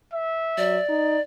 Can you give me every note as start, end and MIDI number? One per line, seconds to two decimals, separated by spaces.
0.13 0.86 76
0.58 0.78 54
0.58 1.21 74
0.89 1.18 63